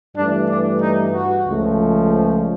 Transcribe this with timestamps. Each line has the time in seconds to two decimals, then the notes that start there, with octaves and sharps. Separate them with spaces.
0.16 G2 E3 A3 D4
0.49 D4
0.82 D#4
1.14 F#4
1.47 C#2 C#3 F3 A3